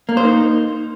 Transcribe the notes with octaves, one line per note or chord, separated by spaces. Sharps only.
A#3
C5
D#4